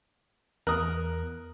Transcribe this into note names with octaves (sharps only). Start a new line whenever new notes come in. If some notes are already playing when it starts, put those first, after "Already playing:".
E2 A#4 D#6 F#6